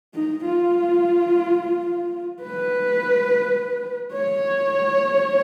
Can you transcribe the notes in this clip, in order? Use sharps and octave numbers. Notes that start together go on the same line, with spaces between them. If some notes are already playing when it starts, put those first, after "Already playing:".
D#4
F4
B4
C#5